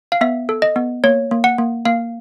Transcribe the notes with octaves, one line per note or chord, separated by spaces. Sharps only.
F5
B3 E5
A4
D#5
B3
A#3 C#5
A#3
F#5
A#3
A#3 F5